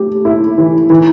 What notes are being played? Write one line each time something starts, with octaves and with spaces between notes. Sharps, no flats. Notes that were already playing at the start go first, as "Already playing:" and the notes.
Already playing: A3 G4
E4
E3
E3